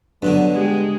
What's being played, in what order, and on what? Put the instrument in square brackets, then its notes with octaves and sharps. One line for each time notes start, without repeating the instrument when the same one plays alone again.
[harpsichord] G2 B2 D3 [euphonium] F#3 [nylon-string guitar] D4
[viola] G#3 [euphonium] G4